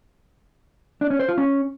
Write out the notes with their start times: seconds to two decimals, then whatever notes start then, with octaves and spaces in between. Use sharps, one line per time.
1.01 D4
1.10 C#4
1.19 C5
1.29 F4
1.38 C#4